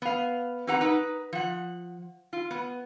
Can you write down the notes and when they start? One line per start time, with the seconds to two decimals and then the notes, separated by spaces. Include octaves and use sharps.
0.02 B3 F5
0.67 C4 G4 B4 F#5 A#5
0.81 D#4 B4
1.33 F3 F#5
2.33 F4
2.51 B3